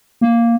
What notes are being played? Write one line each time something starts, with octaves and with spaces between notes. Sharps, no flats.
A#3